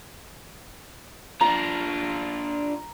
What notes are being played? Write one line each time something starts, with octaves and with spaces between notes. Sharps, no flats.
D4 F4 A#5